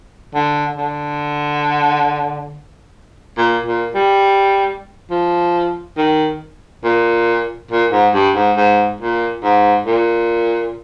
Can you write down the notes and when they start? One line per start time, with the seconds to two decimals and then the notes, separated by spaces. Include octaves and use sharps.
0.35 D3
0.77 D3
3.38 A#2
3.66 A#2
3.95 G3
5.11 F3
5.98 D#3
6.84 A#2
7.71 A#2
7.92 G#2
8.14 G2
8.35 G#2
8.57 G#2
9.01 A#2
9.44 G#2
9.86 A#2